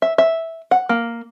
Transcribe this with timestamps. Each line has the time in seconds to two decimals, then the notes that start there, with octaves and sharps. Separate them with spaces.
0.02 E5
0.18 E5
0.71 F#5
0.89 A#3